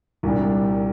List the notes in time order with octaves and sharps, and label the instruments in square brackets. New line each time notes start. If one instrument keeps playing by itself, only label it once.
[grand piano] C2 A#2 G3 D4 G4